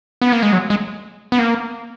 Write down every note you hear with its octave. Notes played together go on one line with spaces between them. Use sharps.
B3
A#3
G#3
F#3
G#3
B3
A#3